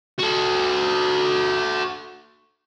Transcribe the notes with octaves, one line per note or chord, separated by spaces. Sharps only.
F#4 A4